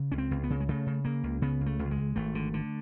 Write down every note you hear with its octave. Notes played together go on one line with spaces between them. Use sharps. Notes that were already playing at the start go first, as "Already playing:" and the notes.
Already playing: C#3
C#2 C#4
C4
C#2
B3
C#3
G#3
C#3 A3
C#3
C#3 A#3
C#2
C#3 B3
C#2
A3
C#2
G#3
C#2
G#1 A3
D3
D3